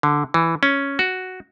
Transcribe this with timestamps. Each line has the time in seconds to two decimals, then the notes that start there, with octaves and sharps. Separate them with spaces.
0.03 D3
0.34 E3
0.63 C#4
0.99 F#4